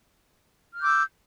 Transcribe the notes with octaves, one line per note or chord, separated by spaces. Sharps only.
D6 E6 F6 G6